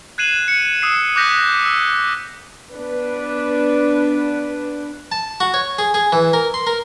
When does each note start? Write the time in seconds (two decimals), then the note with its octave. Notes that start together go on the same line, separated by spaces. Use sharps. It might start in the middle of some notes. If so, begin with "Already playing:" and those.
0.18 F#6 G#6 C7 D#7 E7 F#7
0.48 C#7
0.82 D#6 E6 C7
1.16 D6 F#6 G6 A#6 B6
1.66 E6
2.74 B3 D4 B4
5.12 A5
5.40 F#4
5.54 C#5
5.79 G#4
5.94 G#4
6.12 E3
6.33 A#4
6.54 C6
6.67 A#4